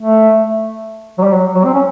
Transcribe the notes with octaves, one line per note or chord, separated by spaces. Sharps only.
A3
F#3
G3
F#3
F#3
C4
C#4